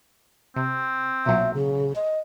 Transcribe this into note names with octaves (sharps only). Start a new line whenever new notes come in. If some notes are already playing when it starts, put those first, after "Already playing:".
C3 C4
B1 A#2 F#3 E5
C#3
D#5